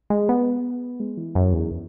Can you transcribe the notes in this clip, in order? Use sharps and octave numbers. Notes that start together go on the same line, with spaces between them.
G#3
B3
G#3
E3
F#2
E2